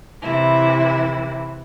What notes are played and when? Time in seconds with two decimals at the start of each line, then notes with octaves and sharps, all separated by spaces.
0.24 C3 E3 E4